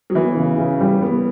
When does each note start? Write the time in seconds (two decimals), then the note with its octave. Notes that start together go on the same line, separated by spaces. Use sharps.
0.10 F#3
0.15 E3 B3
0.37 C#3
0.58 C#3
0.81 G3
1.02 B3